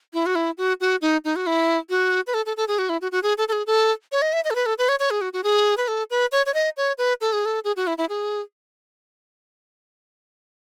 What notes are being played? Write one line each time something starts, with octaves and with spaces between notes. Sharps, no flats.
E4
F#4
E4
F#4
F#4
D#4
D#4
F#4
E4
F#4
B4
A4
A4
A4
G#4
F#4
E4
F#4
F#4
G#4
A4
A4
G#4
A4
C#5
D#5
E5
D#5
A4
B4
A4
B4
C#5
C#5
G#4
F#4
F#4
G#4
B4
A4
B4
C#5
C#5
D#5
C#5
B4
A4
G#4
A4
G#4
F#4
E4
E4
G#4